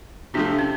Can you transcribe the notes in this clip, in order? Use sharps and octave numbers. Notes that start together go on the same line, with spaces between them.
C3 F3 A3 D4
C#4